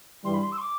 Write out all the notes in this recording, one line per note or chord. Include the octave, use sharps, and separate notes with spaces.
G2 E3 G3 C6
B5
C6
E6
C6
D6